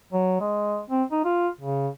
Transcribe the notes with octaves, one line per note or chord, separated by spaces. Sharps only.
F#3
G#3
C4
D#4
F4
C#3